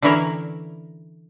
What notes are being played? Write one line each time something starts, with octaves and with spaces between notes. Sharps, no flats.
D3 E3 C#4 E4 A#4